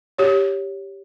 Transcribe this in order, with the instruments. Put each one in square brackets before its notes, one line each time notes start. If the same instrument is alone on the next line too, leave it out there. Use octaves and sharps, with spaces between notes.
[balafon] G4 C#5